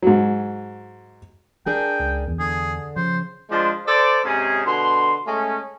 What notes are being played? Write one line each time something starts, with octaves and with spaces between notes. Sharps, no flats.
G#2 F#3
D4 G#4 A#4 G5
C#2
E2
D3 G#4
C#3 F3 C5
F3 G#3 D4 F4 C5
A4 C5 D5
G#2 C3 C#4 G#4
B2 D3 C6
G#3 A3 C#4